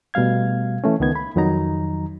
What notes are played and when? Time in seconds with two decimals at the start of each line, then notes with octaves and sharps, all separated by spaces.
0.14 B2 G3 A3 F5 G#6
0.84 E3 A3 C#4
1.00 C#2 D#3 B3 G#6
1.16 B5
1.36 F2 D#3 F#3 D#4 A#5